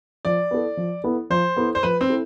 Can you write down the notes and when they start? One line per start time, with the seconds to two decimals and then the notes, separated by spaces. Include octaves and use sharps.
0.25 F3 D5
0.51 B3 E4 A4
0.77 F3
1.04 B3 E4 A4
1.30 F3 C5
1.57 B3 E4 A4
1.75 C5
1.83 F3 B4
2.01 C4
2.10 E4 A4